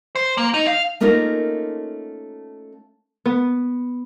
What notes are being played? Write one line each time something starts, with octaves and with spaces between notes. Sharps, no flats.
C5
A#3
D#4
F5
A3 A#3 C#4 D#4 F4 A#4
B3